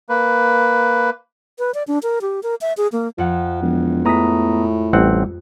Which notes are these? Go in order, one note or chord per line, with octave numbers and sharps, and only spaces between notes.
A#3 B4
B4
D5
D4
A#4
G4
A#4
E5
G#4
A#3
F2 F3 F#5
E1 F3
A2 G#3 B3 A#5 D#6 B6
A1 G3 C4 F#5